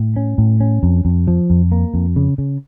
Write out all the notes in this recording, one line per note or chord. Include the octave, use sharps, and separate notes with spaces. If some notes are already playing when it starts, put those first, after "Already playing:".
Already playing: A2
C#4
A2
C#4
F2
F2
F3
F2
A#3
F2
C#3
C#3